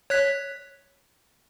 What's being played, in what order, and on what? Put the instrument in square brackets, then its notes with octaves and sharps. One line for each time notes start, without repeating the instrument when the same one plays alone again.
[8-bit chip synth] C#5 F#6 B6